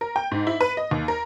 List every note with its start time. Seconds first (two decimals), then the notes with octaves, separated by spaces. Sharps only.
0.01 A#4
0.16 G5
0.31 G#2
0.47 E4
0.61 B4
0.77 D#5
0.91 D#2
1.08 A#4